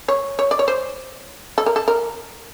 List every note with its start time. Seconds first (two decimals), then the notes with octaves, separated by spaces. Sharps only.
0.08 C#5
0.39 C#5
0.51 D5
0.59 C#5
0.68 C5
1.58 A4
1.66 A#4
1.76 A4
1.88 A#4